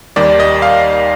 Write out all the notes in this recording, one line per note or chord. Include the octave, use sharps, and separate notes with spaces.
D#2 D#3 G3 D5
D#5
F5